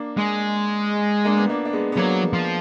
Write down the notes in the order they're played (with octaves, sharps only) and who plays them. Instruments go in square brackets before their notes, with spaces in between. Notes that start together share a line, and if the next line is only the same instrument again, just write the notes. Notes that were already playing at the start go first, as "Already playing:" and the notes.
Already playing: [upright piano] A#3 D4
[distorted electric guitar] G#3
[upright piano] A#3 D4
B3
A#3 D4
D4
G#3 B3
B3
[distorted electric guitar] F#3 [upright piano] A#3 D4
[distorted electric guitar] F3